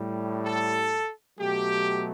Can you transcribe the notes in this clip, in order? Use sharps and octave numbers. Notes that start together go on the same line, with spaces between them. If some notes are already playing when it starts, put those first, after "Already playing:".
Already playing: A2 G3
A4
B2 F#3 A3 G4